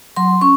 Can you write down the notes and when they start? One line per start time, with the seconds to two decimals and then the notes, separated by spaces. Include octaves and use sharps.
0.16 F#3 C6
0.41 C#4 C#6